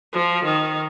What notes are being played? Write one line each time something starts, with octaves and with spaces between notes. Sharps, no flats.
F3
D#3